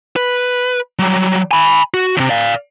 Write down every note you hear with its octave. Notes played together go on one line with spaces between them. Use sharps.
B4
F#3 G3
G#5 B5
F#4
D#2 C3
D5 F5